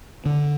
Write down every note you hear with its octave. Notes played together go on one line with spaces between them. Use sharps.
D3